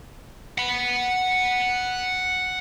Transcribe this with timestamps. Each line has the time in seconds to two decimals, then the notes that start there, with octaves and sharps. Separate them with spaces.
0.58 F#5 B5